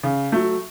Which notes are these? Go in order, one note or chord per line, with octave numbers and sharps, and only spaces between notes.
C#3
F#3 A3